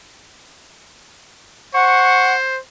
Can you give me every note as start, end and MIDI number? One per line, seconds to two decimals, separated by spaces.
1.74 2.60 72
1.74 2.35 78
1.74 2.34 85